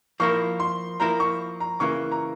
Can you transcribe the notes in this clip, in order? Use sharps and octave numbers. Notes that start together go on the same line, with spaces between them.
F3 A#3 E4 A#4 C#6
C6
F3 A#3 E4 A#4 A#5
C#6
A#5
C#3 E3 A#3 C#6
A#5